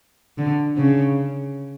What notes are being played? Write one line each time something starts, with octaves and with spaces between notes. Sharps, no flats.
D3
C#3